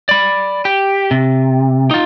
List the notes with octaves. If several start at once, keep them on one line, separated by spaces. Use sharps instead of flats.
D5 B5
G4
C3
D#4 F4